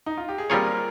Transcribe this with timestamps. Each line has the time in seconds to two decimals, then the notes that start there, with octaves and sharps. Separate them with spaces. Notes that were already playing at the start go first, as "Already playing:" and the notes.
0.06 D#4
0.17 F4
0.29 G4
0.38 G#4
0.50 G3 A#3 C4 F4 G#4 A#4 C#5